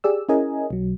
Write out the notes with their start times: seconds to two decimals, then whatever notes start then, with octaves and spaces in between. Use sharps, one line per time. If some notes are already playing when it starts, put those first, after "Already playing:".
0.04 G4 G#4 D5 E6
0.29 C#4 E4 G#4 A#4 D#5 G#5
0.70 B1 F#3